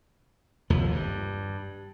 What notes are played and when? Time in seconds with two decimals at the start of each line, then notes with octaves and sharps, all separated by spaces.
0.70 F1 D#2 F3
0.92 G2